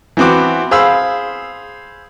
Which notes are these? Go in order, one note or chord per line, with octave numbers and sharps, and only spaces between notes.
E3 B3 C4 F#4 D6
G#4 C5 F5 B5 E6